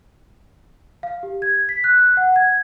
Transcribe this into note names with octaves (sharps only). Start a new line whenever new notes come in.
F5
G4
G#6
B6
F#6
F#5
G#6